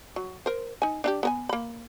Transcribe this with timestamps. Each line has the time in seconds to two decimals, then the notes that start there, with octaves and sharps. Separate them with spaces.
0.16 F#3
0.46 A#4 C5
0.82 D#4 G#5
1.04 D4 E4 G4
1.23 B3 A#4 G#5
1.49 A#3 B5